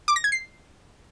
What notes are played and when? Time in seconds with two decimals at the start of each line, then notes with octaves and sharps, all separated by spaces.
0.08 D6
0.16 A#6
0.24 G#6
0.32 C7